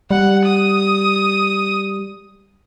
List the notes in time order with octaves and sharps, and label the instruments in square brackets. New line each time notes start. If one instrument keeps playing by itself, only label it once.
[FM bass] G3 [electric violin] F#5
[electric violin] D#6